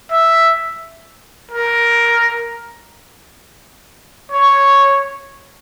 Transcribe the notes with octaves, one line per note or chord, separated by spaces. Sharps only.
E5
A#4
C#5